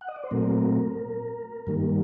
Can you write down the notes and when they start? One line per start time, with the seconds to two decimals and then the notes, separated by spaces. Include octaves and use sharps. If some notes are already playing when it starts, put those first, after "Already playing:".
0.01 F#5
0.08 D#5
0.16 D5
0.24 C5
0.31 A#2 F#3 A3 C4 A#4
1.67 G2 D#3 G3 A#3